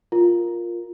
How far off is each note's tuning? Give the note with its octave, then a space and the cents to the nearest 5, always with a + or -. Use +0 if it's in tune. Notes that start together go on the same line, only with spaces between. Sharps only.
F4 +0 A#4 +0